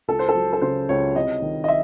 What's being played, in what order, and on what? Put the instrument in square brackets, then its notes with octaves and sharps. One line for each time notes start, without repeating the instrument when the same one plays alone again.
[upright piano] C#2 A4
C5
A4
F#3
A4
C#3 C5
C#2 C#5
C2 D#5
D#3
D#5
E5